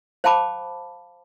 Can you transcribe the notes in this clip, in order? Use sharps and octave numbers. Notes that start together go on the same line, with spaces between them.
C5 F5 G5 A5 B5 D6